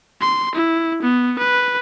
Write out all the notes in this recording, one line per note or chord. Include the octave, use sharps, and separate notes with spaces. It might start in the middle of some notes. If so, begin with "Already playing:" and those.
C6
E4
B3
B4